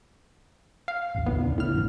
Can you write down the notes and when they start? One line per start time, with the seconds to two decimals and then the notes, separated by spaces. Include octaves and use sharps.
0.88 F5
1.15 A1 D#2
1.26 D2 A2 B3
1.42 C#3 D4
1.58 A2 F6
1.74 A1 F#2 D#3